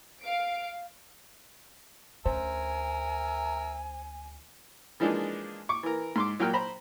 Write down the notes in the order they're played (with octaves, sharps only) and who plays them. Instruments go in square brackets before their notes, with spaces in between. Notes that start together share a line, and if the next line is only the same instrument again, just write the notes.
[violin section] F5 D7
[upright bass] D2 C#4 [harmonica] A#4 E5 [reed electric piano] C5 [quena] G#5
[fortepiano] E3 F3 G#3 A#3 D4 D#4
C#6 D6
E3 A#4
G#2 C6 D6
A#2 F#3 A#3 G5 F6
C5 A#5 B5